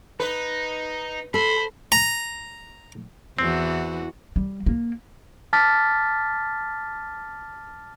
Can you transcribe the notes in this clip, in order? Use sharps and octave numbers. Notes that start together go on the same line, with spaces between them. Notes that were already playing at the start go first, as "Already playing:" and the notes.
D#4 B4
A4 C5 B5
A#5
E2 E3 C4 F#4
G3
A#3
A5 D6 F6 A6 B6